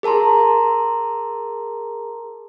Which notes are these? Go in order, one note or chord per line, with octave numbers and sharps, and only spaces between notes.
G#4 A#4 A5 A#5 C6